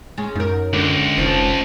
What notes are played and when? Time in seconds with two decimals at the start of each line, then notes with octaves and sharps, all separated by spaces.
0.18 G#3 C#4
0.35 F#2 D#4 A#4
0.73 C#2 D3
1.18 F1 F3 C4 D#4